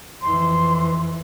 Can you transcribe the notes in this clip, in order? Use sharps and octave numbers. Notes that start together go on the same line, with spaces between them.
F2 E3 C6